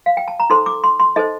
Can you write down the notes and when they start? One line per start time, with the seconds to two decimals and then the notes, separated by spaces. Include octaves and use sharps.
0.06 F5
0.17 G5
0.28 A5
0.40 A#5
0.50 D#4 A4 C5 C6
0.66 D6
0.84 C6
1.00 C6
1.16 D#4 A4 C5 D#5